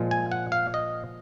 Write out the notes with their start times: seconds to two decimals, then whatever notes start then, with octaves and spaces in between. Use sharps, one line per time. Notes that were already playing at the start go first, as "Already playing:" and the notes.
Already playing: A#2 F3 G#3
0.11 G#5
0.32 F#5
0.52 F5
0.74 D#5